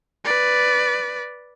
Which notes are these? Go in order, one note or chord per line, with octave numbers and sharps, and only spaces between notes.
B4 D5